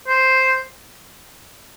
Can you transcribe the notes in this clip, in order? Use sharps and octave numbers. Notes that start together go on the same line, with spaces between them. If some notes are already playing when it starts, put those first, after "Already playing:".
C5